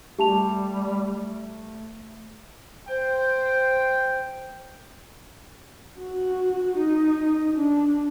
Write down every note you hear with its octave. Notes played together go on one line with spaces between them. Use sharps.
G3 A3 G4 A5 F7
C5 G5
F#4
D#4
D4